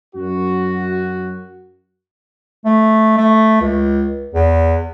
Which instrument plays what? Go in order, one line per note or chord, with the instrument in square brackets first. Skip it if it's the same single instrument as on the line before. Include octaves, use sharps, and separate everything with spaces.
[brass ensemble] F#2 F#4
[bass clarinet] A3
A3
C#2
E2